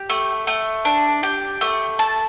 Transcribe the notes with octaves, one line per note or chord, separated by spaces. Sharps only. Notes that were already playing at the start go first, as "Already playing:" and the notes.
Already playing: G4
A3
A3
D4
G4
A3
A5